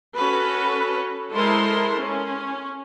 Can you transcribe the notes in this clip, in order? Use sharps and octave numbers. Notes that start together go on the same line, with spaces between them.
C#4 F#4 A4 B4
G#3 E4 A4 A#4 C5 C6
C#4